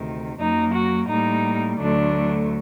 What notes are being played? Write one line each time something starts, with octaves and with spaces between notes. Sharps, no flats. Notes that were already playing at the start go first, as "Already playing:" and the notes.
Already playing: D2 C3 D#3
F#2 F#3 A#3 D#4
F#4
A2 G3 A#3 D#4
D2 D3 F#3 A3 D4